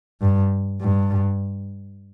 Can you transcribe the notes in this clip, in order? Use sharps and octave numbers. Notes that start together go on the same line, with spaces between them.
G2
G2